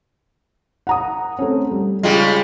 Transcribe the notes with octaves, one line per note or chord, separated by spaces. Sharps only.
F#5 A#5 D#6
A3 C4 C#4
G3
C#3 G3 G#3 F4 G5